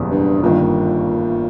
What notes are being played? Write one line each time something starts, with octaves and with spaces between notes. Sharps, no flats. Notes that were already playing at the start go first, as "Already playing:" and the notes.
Already playing: F#1 E2 B2 G3 A#3
G2
G1 G2 A#2 D#3